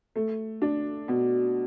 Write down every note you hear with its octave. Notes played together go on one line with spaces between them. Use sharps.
A3
D4
B2